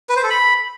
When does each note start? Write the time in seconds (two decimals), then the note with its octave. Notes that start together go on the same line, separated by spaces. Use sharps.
0.09 B4
0.16 C5
0.23 A4
0.30 B5